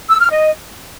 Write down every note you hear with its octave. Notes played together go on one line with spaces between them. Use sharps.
E6
F6
D#5